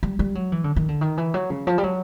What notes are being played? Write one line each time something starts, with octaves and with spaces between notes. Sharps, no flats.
G3
G3
F#3
E3
D3
D#3
D3
D#3
E3
F#3
C#3
F3
G3
F#3